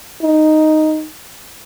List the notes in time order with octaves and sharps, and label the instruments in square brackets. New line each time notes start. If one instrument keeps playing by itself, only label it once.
[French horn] D#4